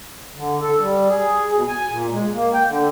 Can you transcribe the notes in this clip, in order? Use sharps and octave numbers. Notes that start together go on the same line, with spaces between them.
D3
A4
G3
G#4
B2
G#5
A#2
G#3
A#3
G5
D3